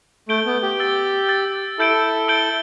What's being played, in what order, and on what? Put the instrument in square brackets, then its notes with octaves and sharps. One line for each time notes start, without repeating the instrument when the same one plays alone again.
[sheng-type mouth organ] A3 [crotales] G6 D7 G7
[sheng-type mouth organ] B3
G4
[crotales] E6 A6 G7
E6 A6 G7
[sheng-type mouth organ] E4 A4 [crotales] E6 G6 D7 G7
[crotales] E6 G6 D7 G7